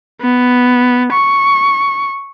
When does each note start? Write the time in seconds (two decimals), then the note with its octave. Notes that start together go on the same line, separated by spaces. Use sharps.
0.21 B3
1.13 C#6